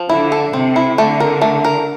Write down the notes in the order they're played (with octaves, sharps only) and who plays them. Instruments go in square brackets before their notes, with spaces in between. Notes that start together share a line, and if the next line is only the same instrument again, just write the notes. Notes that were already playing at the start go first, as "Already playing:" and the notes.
Already playing: [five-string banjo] F3
[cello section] D3 [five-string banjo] E4
[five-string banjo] A4
[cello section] C3 [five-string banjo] C4
[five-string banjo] E4
[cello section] D3 [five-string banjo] A3
[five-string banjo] A#4
A3
A#4